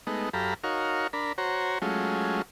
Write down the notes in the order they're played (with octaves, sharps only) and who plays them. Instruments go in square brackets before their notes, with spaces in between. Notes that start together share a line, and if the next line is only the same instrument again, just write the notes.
[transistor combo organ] G#3 A3 B3 D#4
F#2 G4 A4 F5 A#5 B5
D#4 F#4 A#4 C#5 F5
D4 A#4 B5
F#4 C5 C#5 A#5
F#3 G#3 A3 C#4 F4